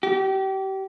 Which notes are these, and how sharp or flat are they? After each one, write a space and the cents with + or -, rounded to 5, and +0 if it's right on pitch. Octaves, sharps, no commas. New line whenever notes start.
G4 -30